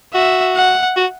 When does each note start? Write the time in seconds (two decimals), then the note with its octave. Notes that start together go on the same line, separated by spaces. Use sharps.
0.14 F#4 E5
0.56 F#5
0.97 F#4